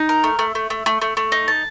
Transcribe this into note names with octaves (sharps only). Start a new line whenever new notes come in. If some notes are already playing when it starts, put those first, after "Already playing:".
Already playing: D#4
A#4
A3
A3
A3
A3
A3
A3
A3
D#4
A5